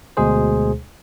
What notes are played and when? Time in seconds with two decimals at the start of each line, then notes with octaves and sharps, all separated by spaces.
0.17 D2 B2 G#3 G#4 C5